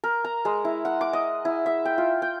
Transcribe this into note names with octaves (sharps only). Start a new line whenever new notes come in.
A#4
A#5
G#3
E4
F#5
D6
D#5
E4
E5
G5
F4
G5